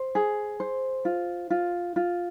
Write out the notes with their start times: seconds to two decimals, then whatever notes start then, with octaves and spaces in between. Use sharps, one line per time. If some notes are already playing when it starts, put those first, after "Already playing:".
Already playing: C5
0.15 G#4
0.60 C5
1.05 F4
1.50 F4
1.96 F4